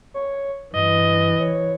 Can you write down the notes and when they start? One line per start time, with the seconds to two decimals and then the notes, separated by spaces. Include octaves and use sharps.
0.14 C#5
0.75 G2 E3 D#5
1.40 C#5